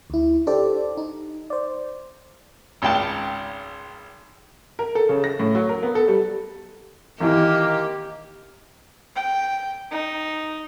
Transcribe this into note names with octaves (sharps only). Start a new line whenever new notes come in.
D2 E4
D4 G4 A4 C5 D5
D#4
C5 D5
G#1 C#2 G5 A5
A#4
A4
C#3
A#6
A2
F#3
A#4
B3
A4
G3
G#1 E3 A#3 G4 D#5
G5
D#4